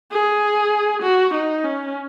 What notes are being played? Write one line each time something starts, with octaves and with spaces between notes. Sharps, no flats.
G#4
F#4
D#4
C#4